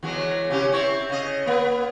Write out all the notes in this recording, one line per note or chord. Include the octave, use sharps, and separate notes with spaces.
E2 F#3 G#3
C3 C#4 G4
C4 E4 C#5
C#3 D#5
A#3 B3